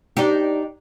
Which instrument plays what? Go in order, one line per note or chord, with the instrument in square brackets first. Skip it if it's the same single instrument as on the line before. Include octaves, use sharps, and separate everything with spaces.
[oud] D4 D#4 G4